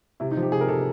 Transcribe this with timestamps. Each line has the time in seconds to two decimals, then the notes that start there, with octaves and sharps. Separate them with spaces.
0.20 C3 E4
0.31 D#4
0.37 F3
0.42 G4
0.52 C3 G#4
0.61 A#4
0.68 C3 A4